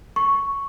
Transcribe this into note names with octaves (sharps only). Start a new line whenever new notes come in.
C#6